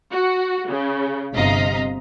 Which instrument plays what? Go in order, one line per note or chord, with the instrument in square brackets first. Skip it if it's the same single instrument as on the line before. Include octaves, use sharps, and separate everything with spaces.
[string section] F#4
C#3
G1 C3 D#5 F5 A#5 B6